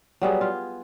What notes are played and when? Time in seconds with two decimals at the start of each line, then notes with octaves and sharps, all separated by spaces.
0.22 F#3 G3 B3 G#4
0.41 F4